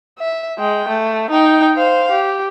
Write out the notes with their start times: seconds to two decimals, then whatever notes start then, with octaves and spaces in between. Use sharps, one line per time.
0.19 E5
0.59 G#3 G5
0.89 A3
1.31 D#4 G5
1.77 C5 F5
2.12 G4